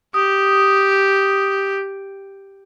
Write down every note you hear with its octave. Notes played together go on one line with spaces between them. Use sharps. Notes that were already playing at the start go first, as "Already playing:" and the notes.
G4 D#6